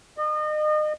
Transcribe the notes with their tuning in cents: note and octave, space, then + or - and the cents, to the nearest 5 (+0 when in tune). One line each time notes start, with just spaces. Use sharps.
D#5 -35